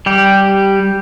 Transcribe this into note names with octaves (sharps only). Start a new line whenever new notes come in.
G3 G4